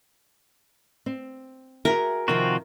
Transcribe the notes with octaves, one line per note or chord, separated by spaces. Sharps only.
C4
F#4 G#4 A#4 E5
C3 D#3 F3 C4 F4 F#4